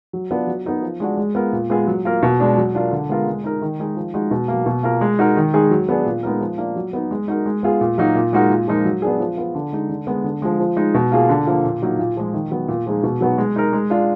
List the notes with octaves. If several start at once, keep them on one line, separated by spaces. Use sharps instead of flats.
F#3
B3 D4 F4
F#3
B3 D#4 A#4
F3
G#3 D4 F#4
G#3
B3 F4 A#4
A#2
G#3 B3 F4 G#4
F#3
A#3 F4 A#4
B2
G#3 D4
F#3
D4 F4 A#4
D3
G#3 B3 F4 A#4
G#3
D#4 A#4
D#3
G#3 D#4 G#4
F3
G#3 D#4 F#4
B2
F#3 A#3
B2
A#3 F4 A#4
G#3
D#4 F#4 A#4
D#3
G#3 D#4 G#4
F#3
B3 D4 G#4
A#2
G#3 B3 D#4 A#4
F3
A#3 D4 F4
F#3
B3 D#4
G#3
D#4 F#4 A#4
G#3
B3 F4 G#4
A#2
F#3 A#3 D#4 F#4
A#2
G#3 D#4 F#4 A#4
A#2
F3 G#3 D#4 A#4
F#3
B3 D4 G#4
F3
B3 F4
D3
G#3 D#4
D3
G#3 B3
D3
F3 G#3
F3
G#3 D#4
B2
A#3 F4 G#4
D3
F3 A#3
A#2
F#3 A#3 D#4 F#4
A#2
F3 G#3
D#3
F#3 B3
A#2
F3 G#3 D#4 G#4
B2
F#3 B3 D#4 F#4
G#3
D#4 A#4
G#3
D4 F4